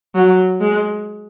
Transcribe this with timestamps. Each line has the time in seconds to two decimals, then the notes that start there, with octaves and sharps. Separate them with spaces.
0.15 F#3
0.60 G#3